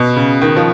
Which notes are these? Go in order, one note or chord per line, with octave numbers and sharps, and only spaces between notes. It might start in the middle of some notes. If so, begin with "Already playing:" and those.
Already playing: B2
C#3
D#3
F3